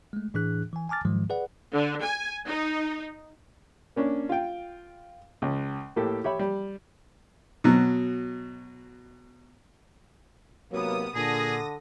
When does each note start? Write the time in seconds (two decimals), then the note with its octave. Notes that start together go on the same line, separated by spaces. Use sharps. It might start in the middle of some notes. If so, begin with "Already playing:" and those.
0.13 G#3 A3
0.34 A2 E3 D4 G#4 F#6
0.73 E3 G#5
0.89 G#5 A5 D6 F6 A6
1.05 G#2 D#3 F3 F#3 G#3
1.30 G#4 B4 D5 F#5
1.73 D3
2.04 G#5
2.47 D#4
3.96 A#3 C#4 D4
4.29 F4 G5
5.42 C#2
5.96 A2 A#3 G4 A4
6.24 G4 C#5 E5 B5
6.39 G3
7.64 B2 F#3
10.72 G#2 C3 F#3 A#3 B3 D#6
11.15 A#2 D3 G#4 A4 D#6 A#6